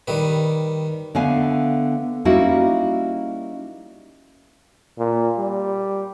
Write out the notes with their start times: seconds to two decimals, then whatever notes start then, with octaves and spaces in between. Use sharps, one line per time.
0.08 D#3 G3 B4
1.15 D3 A3 B3 F5 G#5
2.25 G3 A#3 C#4 D#4 E4 F#4
4.98 A#2
5.38 G3